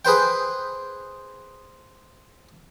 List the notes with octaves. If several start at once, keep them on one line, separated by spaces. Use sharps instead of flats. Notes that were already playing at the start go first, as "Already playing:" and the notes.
G#4 B4 C5 G5